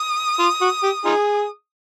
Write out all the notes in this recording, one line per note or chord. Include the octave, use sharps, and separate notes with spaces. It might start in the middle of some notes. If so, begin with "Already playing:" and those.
Already playing: D#6
F4
F#4
G4
D#4 F4 G#4